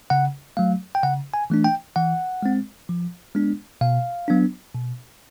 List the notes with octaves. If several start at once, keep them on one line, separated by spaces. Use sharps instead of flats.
C#3 F#5
F#3 A3 F5
G5
C#3 F#5
G#5
E3 A3 D4
G5
E3 F#5
G#3 C4
F3
G#3 B3 D4
B2 F5
F#3 B3 D4
B2